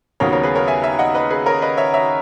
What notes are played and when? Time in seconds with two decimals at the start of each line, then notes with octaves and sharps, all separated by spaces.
0.20 D#2 C#3 F#3 B3 A#4 C#5
0.33 A#4 C#5
0.43 G#4 B4
0.55 A#4 C#5
0.67 E5 G#5
0.84 E5 G#5
0.99 D#5 F#5
1.15 B4 D#5
1.30 G#4 B4
1.46 A#4 C#5
1.62 B4 D#5
1.77 C#5 E5
1.94 C#5 E5